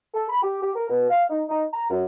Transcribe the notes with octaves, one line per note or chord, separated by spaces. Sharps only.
A4
B5
G4
G4
A#4
B2
F5
D#4
D#4
A#5
F#2